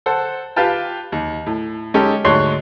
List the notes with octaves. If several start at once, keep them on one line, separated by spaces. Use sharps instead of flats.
A4 C5 F#5
F4 G4 B4 F5 G5 A5
D#2
A2
G#3 C#4 D#4 G4 A4
D2 G#2 G#3 C#5 C6 F#6